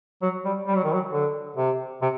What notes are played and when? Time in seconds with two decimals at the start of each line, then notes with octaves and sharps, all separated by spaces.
0.22 F#3
0.45 G3
0.67 G3
0.76 F#3
0.84 D#3
0.93 F#3
1.12 D3
1.57 C3
2.02 C3